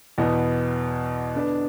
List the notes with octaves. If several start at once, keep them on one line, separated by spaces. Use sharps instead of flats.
E2 B2 B3
D3 B3 D4 B4